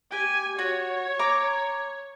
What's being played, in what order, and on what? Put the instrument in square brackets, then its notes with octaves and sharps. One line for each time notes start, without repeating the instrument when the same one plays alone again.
[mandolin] G4 [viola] G#5
[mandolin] F#4 [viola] C#5
[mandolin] A#5 D6